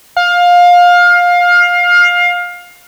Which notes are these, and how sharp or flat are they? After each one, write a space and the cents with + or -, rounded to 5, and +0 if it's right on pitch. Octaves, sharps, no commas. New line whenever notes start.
F5 +20